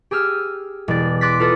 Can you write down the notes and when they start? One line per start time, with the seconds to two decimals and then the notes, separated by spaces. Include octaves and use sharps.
0.11 G4 G#4 E6 F6
0.88 E1 D5
1.21 C6 D6 F#6 A6 B6
1.40 F4 A4 B4 D#6